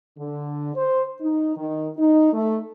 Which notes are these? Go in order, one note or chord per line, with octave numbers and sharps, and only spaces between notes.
D3
C5
D#4
D#3
D#4
A3